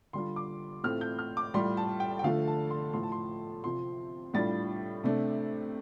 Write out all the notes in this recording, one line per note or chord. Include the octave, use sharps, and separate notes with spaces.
D3 G3 D4 F4 C6
D6
A2 A3 C4 F4 F6
G6
F6
D6
A2 G3 F4 C6
A5
G5
G5
D3 F3 A3 F4 F5
A5
C6
A2 F3 A3 C6
A5
C6
C3 F3 C4 F4 C6
A2 G3 D4 F4 A6
C3 A3 D4